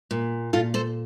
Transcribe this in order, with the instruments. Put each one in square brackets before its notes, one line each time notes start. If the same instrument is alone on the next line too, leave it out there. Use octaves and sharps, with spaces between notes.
[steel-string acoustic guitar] A#2
A#2 F4 A4
A4 C5